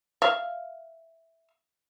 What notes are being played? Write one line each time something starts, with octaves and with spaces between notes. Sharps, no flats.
E5 F5